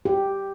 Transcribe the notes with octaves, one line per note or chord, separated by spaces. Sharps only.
G4